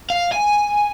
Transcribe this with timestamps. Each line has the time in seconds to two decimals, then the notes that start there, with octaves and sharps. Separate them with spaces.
0.10 F5
0.32 G#5